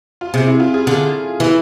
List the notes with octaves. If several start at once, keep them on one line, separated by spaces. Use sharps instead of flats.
F4
C3 G#4
E4
F4
G#4
D3 G#4
E3 E4